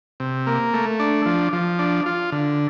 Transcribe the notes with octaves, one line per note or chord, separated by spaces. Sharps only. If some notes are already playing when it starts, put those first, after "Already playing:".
C3
A#3
A3
D4
F3
F3
D4
F4
D3